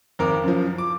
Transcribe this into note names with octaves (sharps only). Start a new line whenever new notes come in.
G#1 F2 A#4 D6
F#2 F3
D6